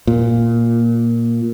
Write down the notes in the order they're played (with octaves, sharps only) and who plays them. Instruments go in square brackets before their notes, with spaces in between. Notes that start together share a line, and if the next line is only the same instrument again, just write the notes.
[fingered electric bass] A#2